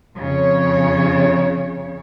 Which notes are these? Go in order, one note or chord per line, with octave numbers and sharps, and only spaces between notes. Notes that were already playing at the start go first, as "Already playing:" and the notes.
F2 C#3 C#5